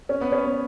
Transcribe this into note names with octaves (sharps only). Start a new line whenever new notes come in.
C#4
B3
C#4
B3